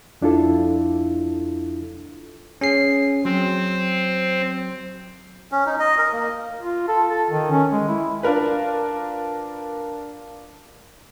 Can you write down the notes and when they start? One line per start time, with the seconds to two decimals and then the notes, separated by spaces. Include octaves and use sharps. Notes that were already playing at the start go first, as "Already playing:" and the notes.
0.21 F2 D4 E4 F4 A4
2.61 C#4 G#4 C7
3.25 F#3 C4
5.52 C#4
5.66 D#4
5.80 D#5
5.98 A#4
6.13 A#3
6.61 F4
6.88 A4
7.08 A4
7.30 D#3
7.51 C#4
7.72 G#3
7.88 E4
8.23 D4 F4 A#4 B4